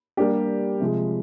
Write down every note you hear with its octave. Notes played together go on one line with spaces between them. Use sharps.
G3 A#3 D4 G4
C3 F3 G#3